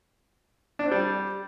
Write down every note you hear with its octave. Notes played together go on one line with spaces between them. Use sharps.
D4
C4
G3